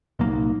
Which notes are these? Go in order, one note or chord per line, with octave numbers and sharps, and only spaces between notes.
C2 A#2 F#3 A#3 D#4